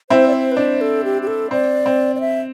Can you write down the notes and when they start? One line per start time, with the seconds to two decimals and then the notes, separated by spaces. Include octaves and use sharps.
0.10 C4 E4 C5
0.27 D5
0.33 C5
0.51 B4
0.57 D4 C5
0.81 A4
1.04 G4
1.22 G4
1.27 A4
1.51 C4 D5
1.86 C4
2.16 D5
2.20 E5